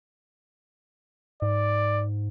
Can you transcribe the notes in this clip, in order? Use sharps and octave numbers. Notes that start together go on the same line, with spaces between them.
G#2 D5